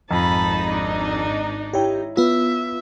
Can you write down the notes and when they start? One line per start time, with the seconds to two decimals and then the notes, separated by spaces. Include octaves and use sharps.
0.11 G#1 F2 D#4 A5 B5
0.71 D4
1.73 E4 G4 C#5 G5
2.17 B3 F4 E5